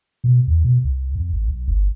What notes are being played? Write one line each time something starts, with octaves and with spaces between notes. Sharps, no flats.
B2
E2
B2
C2
F2
A1
B1
G1